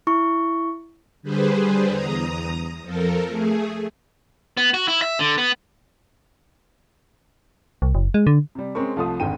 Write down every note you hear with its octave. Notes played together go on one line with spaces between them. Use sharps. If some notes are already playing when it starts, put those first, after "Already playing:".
E4 C#6
D3 G3 G#4 B4 C5
E2 A#5 D#6
F2 F3 A4 A#4
A3 G#4
B3
F#4
E4
E5
D3
B3
C2
F#1
G#3
D3
C3 G3
G#3 C4 C#4 A#4 C#6
C2 F3 A3 F4 D#6
F1 G#2 D3 D#3 G5 D#7